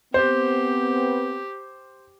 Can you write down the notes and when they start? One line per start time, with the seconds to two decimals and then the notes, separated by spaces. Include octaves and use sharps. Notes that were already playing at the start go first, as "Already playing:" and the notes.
0.14 B3 C4 G4 C5